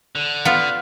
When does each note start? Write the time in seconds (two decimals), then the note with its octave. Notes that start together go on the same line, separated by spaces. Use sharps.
0.15 D3
0.45 B3 F4